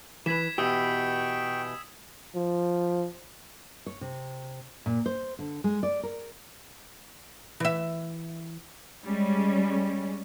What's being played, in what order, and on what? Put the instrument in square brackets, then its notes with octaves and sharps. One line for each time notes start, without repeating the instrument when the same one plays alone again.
[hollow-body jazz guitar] E3 B4 [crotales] G#6 B6 E7
[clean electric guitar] B2 E3 [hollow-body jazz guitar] G4 [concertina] G5 C#6 [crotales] D#6 E6
[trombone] F3
[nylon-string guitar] C#5
C3
A#2
C5
D3
G#3
D5
A#4
[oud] E3 E5
[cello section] G3 G#3 C#4